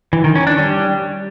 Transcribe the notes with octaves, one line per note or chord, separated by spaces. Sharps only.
E3
D#3
C#4
D4
G3